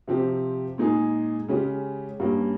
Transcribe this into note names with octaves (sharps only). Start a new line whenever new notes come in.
C3 F3 C4 G4
A#2 G#3 D#4 G#4
C#3 G#3 C#4 G4
G2 G3 A#3 C#4